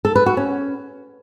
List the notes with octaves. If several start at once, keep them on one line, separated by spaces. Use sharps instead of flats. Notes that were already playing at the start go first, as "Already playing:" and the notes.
A4
B4
F#4
C#4